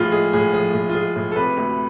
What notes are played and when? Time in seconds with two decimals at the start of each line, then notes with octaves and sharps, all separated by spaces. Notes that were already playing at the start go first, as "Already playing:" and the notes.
Already playing: A2 F3 F4 G#4
0.12 G#3 G#4
0.33 A2 G#4
0.53 F3 G#4
0.74 A2
0.89 F4
0.95 G#3 G#4
1.16 A2
1.32 A4
1.36 C3 B4
1.57 D2